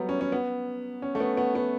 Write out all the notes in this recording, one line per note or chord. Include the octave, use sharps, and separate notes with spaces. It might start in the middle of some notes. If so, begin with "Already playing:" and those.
Already playing: F#3 G3 A3 B3
C#4
C#4
B3
C#4
A3
B3
B3
B3